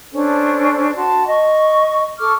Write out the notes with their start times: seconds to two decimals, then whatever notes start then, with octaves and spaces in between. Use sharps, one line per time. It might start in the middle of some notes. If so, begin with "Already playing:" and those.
0.12 C#4 D4 A4 C5
0.96 F#4 A5 C6
1.26 D#5 C#6
2.19 A4 C#6 D6 F6